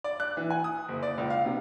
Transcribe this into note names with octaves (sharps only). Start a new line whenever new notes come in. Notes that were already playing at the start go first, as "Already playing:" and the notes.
D5
F#6
E3
G#5
D#6
F#1
D5
C#2
F5
C3